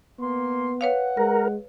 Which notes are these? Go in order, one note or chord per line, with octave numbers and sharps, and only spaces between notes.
A#3 B3 C6
B4 C#5 F5 F#5
G#3 A#4